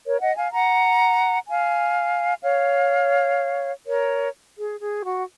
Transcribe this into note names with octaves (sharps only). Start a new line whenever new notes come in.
A#4 C#5
D#5 F#5
F5 G#5
F#5 A#5
F5 G#5
C#5 F5
A#4 C#5
G#4
G#4
F#4